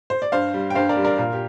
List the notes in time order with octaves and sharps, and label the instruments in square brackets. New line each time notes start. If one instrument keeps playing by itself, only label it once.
[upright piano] C5
D5
G2 C5 F5
G3
G5
G2 C5 F5
A#4 D5
G3
A#4 D5
A#2 F4 A#4
G4